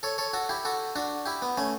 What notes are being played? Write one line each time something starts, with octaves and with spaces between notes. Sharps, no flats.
A4 C#5
A4 C#5
F#4 A4
E4 G4
F#4 A4
D4 F#4
E4 G4
B3
A3 C#4